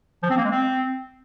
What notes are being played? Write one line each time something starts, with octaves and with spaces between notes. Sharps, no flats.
F3
C4
A#3
G#3
C4